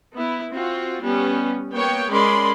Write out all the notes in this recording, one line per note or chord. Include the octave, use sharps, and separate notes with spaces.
B3 E4
C4 F4 F#4
G3 B3 C#4
A#3 B3 C#5 G5
G#3 C#4 A#4 D5 B5 C6